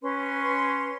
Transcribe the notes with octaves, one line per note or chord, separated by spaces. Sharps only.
C#4 B4 C6